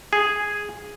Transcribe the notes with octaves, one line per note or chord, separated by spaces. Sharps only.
G#4